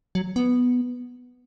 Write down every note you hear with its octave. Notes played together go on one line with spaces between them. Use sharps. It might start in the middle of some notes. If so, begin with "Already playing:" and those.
F#3
B3